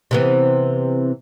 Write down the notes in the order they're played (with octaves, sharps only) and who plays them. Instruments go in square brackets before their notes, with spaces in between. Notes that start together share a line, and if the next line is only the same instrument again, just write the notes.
[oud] C3 E3 B3